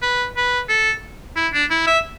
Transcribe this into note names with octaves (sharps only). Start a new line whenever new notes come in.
B4
B4
A4
E4
D4
E4
E5